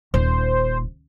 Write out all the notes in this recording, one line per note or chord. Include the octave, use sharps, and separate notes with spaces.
D#1 C5